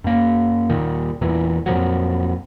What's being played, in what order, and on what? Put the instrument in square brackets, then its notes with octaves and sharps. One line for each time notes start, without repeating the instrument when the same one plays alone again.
[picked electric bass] F#2 A#3
D#2 A#2 D#3
E2 A#2 E3
F2 A#2 F3 F#3